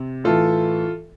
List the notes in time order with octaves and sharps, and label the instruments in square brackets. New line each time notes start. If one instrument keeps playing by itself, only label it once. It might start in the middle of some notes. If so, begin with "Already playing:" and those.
Already playing: [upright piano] C3
A2 E3 F4 A4